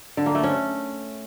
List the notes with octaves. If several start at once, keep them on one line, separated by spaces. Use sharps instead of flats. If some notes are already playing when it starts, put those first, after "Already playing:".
D3
A#3
A3
C#4